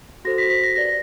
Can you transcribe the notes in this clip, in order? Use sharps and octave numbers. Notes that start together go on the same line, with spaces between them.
F#4 A4 C5 A#6
B6
B6
A#6
G4 B4 D5 A#6